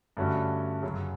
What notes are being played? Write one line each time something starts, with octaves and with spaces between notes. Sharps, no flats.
G2 D3 A3 C#4 F#4
F#2 C#3 F#3